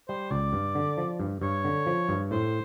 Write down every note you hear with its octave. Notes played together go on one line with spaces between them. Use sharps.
G3 C5
C#2 D5
G2
D3
F3
G2
G2 C#5
D3
F3
G2
A2 C5